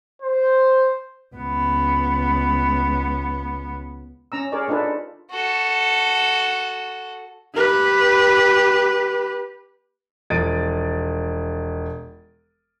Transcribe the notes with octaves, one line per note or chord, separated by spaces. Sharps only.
C5
C#2 B3
C#4 A#5 E6
G#4 A#4 C#5 D5
D4 D#4 F4 A4 B4
F#4 A4
G4 B4
E1 F3 A6 D7 D#7